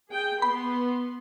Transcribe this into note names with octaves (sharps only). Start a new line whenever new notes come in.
G#4 G5
B3 B5 C6